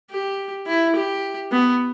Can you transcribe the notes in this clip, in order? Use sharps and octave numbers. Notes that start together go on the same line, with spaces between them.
G4
E4
G4
B3